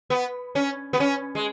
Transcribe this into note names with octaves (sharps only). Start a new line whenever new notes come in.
B3
C#4
B3
C#4
G#3